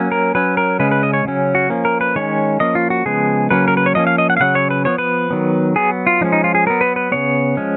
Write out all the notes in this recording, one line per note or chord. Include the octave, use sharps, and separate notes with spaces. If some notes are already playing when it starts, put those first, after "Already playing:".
Already playing: F#3 A#3 C#4
A#4
F#3 C#4 B4
A#4
C#3 G#3 C#4 B4
B4
D#5
C#5
C#3 F#3 C#4
F#4
F3 A#3 C#4
A#4
B4
D#3 G#3 C#4 C#5
F3 A#3 C#4 D#5
F4
F#4
C#3 F3 G#3 B3 G#4
C#3 F#3 A#3 C#4 B4
A#4
B4
C#5
F3 A#3 C#4 D#5
F5
D#5
F#5
F5
C#3 F#3 C#4 F#5
C#5
B4
F3 B3 C#5
B4
D#3 F#3 B3
F#3 B3 G#4
F4
F3 G#3 C#4 D#4
D#4
F4
G#4
F#3 B3 A#4
B4
B4
C#3 F3 B3 C#5
F3 G#3 C#4